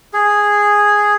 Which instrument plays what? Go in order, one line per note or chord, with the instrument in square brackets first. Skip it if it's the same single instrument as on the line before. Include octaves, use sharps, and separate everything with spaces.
[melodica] G#4